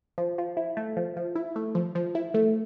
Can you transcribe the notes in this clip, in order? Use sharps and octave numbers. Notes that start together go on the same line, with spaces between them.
F3
F3
E4
A3
F3
F3
E4
A3
F3
F3
E4
A3